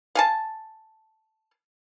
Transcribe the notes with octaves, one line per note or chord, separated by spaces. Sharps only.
F5 G#5 A5